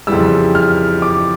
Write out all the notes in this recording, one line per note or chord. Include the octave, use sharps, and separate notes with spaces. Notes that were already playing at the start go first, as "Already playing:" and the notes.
F2 C#3 E3 G3 E6
F6
D6